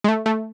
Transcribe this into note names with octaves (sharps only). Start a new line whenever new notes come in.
G#3
A3
A3